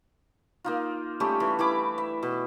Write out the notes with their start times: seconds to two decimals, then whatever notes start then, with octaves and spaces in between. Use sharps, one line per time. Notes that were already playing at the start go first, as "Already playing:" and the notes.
0.64 A#3 D#4 F4
1.20 G3 A3 C#4 G4
1.40 E3
1.59 E3 E4 B5 D6
1.98 E5
2.23 B2